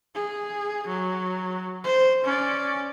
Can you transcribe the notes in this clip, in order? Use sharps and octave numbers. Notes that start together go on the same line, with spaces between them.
G#4
F#3
C5
C#4 D5